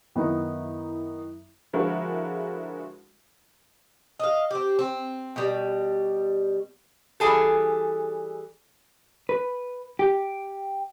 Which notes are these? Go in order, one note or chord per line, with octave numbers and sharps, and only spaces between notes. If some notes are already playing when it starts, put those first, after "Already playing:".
F#2 D#3 B3 D#4 E4
D3 F3 G#3 E4 F#4 A#4
D#5 F5
C4 G4
C4
B2 G3
E3 G3 G#4 A4
B4
G4